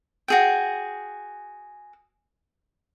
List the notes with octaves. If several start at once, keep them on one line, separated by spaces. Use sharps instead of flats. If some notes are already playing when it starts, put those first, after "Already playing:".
F#4 G#4 G5